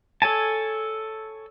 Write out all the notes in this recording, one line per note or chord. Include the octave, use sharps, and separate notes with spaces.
A4 C#5 G#5 A5